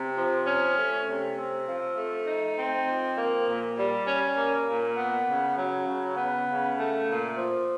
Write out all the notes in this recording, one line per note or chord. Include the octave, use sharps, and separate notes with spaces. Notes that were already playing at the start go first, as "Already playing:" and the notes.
Already playing: C3
F3
C#4
A3
C3
C4
F3
A3
D#4
C4
F3
A#3
A#2
G3
C#4
A#3
A#2
B3
C#3
F#3
C#3
B3
C#3
A3
A#2
F3